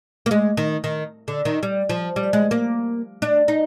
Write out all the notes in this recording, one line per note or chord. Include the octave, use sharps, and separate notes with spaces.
A#3
G#3
D#3
D#3
D3
D#3
G3
F3
G3
G#3
A#3
D4
D#4